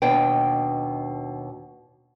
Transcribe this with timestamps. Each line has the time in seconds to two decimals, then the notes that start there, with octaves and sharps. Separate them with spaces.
0.02 D#2 B2 D4 B4 G5